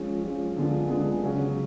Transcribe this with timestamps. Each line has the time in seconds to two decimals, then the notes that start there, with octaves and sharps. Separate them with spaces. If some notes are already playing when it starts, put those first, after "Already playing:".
Already playing: F3 G#3 C#4
0.24 F3 G#3 C#4
0.57 D3 G#3 B3 F4 G#4
0.90 D3 G#3 B3 F4 G#4
1.23 C#3 F#3 C#4 F#4